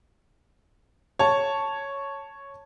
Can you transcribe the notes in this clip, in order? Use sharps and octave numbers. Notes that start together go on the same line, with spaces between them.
C#5 A5